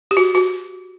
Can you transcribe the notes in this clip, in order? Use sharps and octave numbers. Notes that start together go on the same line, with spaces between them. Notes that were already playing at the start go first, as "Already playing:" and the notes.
G4
F#4
F#4